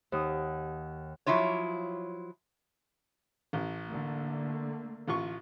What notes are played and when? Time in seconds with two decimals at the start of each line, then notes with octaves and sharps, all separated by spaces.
0.12 D#2 F#5 D#6
1.26 F3 F#3 E4 F4 C#5
3.53 A1
3.88 D3 A3 A#3
5.08 A1 F4 C#6